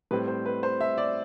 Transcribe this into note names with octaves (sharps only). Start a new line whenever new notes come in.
A2 G3 C4 B4
C5
B4
C5
E5
D5